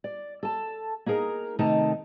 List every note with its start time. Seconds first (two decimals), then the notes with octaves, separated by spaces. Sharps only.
0.04 D5
0.43 A4 A5
1.06 A#3 D#4 G#4 A#4 A#5
1.59 C3 D#3 A3 D#4 A#4 A5